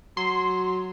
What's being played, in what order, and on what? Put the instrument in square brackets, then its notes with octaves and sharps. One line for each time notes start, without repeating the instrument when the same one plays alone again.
[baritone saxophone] F#3 [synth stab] C6